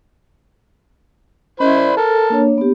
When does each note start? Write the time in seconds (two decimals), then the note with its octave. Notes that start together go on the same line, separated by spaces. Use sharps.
1.60 C#4 E4 C5 D#5 B5 C6
1.76 D5
1.97 A4 A#4 A5
2.30 A#3 D4 C#5
2.58 B3 G4